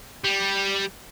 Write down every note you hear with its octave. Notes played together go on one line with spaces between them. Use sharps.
G3